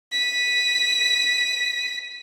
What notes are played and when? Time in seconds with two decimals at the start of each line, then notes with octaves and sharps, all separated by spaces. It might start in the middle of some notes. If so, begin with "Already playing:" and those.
0.12 B6 D#7